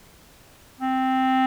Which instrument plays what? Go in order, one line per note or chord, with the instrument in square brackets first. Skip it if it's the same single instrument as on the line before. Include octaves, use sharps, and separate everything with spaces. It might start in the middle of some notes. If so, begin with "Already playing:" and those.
[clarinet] C4